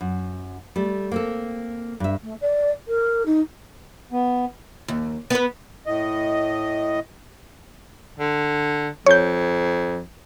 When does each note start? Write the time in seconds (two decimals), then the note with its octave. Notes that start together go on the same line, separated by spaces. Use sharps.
0.01 F#2
0.76 G3 A3
1.11 A#3 C4 A4
2.00 G2 E5
2.22 A3
2.40 D5
2.88 A#4
3.25 D#4
4.12 B3
4.88 D#2
5.30 B3 B4
5.86 A2 D#5
8.20 D3
9.06 F2 C#5 G6